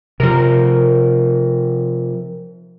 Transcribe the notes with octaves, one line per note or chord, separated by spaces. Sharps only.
C3 F3 A#4